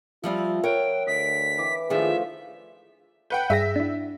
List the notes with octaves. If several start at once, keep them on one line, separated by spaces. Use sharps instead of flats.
F3 G3 C4 F4 E5
A#4 C#5 F#5 G5
D2 D#5 B6
E3 G5 D6
A2 D#3 F3 D4 F4 G#4 E5
B4 F#5 G5 G6
G2 G#4 E5 A#6
D4 E4